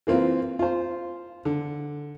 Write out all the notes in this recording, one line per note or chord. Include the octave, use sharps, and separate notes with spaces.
E3 A#3 C4 F4
F4 C5
D3